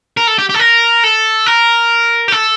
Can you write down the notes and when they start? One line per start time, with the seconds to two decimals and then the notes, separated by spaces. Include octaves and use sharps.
0.17 A#4
0.27 A4
0.39 G4
0.49 G4
0.54 A4
0.59 A#4
1.04 A4
1.46 A#4
2.28 G4
2.32 A4